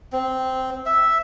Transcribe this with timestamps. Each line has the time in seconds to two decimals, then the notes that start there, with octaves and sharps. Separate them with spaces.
0.12 C4
0.86 E5